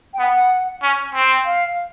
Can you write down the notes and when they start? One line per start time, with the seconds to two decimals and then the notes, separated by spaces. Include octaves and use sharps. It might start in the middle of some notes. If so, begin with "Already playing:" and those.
0.14 G5
0.19 B3 F#5
0.83 C#4
1.14 C4
1.45 F5